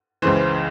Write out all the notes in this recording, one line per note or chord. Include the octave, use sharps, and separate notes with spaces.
C#2 C#3 E3 C5